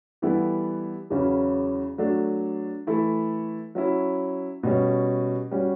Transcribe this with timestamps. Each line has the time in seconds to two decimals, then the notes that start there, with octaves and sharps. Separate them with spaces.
0.22 E3 G3 B3 E4 A4
1.10 E2 C#3 F#3 C#4 E4
1.98 F#3 A3 D4 A4
2.87 E3 A3 E4 A4
3.75 F#3 C#4 E4
4.63 B2 G3 C#4
5.51 G3 C#4 F#4